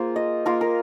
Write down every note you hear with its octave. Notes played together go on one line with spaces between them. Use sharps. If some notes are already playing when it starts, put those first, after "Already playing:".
Already playing: A#3 F4 G#4 C5
D#5
A#3 F4 A#4
A#4